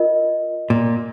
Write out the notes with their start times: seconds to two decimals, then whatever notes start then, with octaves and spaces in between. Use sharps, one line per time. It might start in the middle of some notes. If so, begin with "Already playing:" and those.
Already playing: F4 A#4 D#5
0.70 A#2